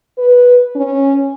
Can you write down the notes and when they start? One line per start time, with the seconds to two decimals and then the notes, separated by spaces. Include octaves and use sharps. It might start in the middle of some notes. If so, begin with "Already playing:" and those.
0.18 B4
0.75 C#4